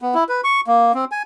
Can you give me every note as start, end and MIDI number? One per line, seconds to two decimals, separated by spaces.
0.02 0.14 59
0.14 0.24 64
0.29 0.41 71
0.44 0.61 85
0.67 0.92 58
0.94 1.05 60
1.12 1.23 80